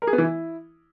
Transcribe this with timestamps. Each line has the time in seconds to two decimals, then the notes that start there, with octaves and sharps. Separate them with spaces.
0.02 A#4
0.07 G#4
0.13 B3
0.18 E3
0.24 E4